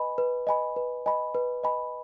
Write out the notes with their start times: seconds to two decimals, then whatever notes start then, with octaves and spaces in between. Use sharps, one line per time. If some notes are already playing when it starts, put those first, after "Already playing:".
Already playing: B4 D#5 G#5 B5
0.18 B4
0.47 D#5 G#5 B5
0.76 B4
1.06 D#5 G#5 B5
1.35 B4
1.64 D#5 G#5 B5